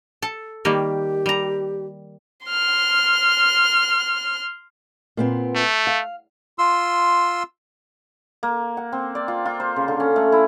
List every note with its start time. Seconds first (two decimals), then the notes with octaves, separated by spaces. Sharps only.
0.22 A4 A5
0.65 D#3 G3 A#3 G4
1.26 G3 A#5
2.47 C6 F6
5.17 A#2 B3 C4
5.55 A3
5.87 F5
6.59 F4 C6 E6
8.43 A#3
8.77 F#5
8.93 C4
9.15 D5
9.28 F4
9.46 F4
9.60 C5
9.76 C#3
9.88 D3
10.00 C#4
10.16 A3
10.32 E4